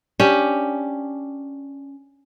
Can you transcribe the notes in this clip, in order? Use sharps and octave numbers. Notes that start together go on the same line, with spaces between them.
C#4 D4 G4